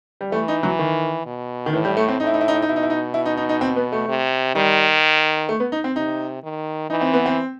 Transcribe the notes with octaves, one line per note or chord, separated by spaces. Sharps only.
G3
E3 A3
D#4
F#3
D#3
B2
D#3
A2 E3
G3
A3
C4
A2 D#4
E4
D#4
E4
D#4
E4
D#4
B2 E4
D#4
E4
D#4
E4
D#4
D#4
D#4
C4
B3
A3
C3
D#3 G3
A3
B3
D#4
C4
C3 D#4
D#3
E3 D#4
C4
B3
C4